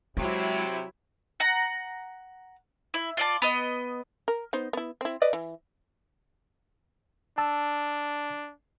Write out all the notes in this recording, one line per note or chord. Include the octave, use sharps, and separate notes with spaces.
C3 F#3 G#3 E4
F#5 A#5
E4
F4 D5 A5
B3 D#5
A#4
B3 D#4 C5
B3 E4
C4 E4
B4 D5 D#5
E3
D4 A5 E6